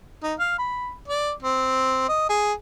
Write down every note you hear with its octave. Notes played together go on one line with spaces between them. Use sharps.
D#4
F5
B5
D5
C4
D#5
G#4